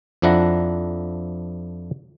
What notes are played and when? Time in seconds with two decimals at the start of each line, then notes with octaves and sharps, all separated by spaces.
0.22 F2 F3 D4 E4 F#5 A#5